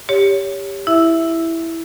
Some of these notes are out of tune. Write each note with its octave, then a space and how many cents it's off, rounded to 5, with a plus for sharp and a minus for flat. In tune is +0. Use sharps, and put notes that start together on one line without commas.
G4 +10 C#5 +15
E4 +0 E5 +0